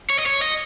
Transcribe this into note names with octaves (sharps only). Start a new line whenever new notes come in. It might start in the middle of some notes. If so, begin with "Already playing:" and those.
C#5
D#5
C#5
D#5